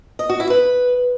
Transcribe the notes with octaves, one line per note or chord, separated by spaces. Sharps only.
D#5
F#4
E4
B4